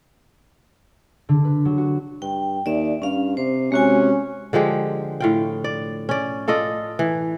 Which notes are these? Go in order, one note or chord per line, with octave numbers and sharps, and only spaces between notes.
D3
B4
F#3
F#4
G2 G5
D#2 D5 E5
G2 C#4 F5
C3 C5
C3 G#3 C#4 F#4 G#5
D3 F3 G#3 G4
A2 F4 G5
D5
C#4 D5
F4 A4 D5 D#5
E3